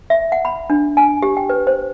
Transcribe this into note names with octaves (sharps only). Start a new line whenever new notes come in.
E5
F#5
B5
D4
G#5
G4
G5
B4
C5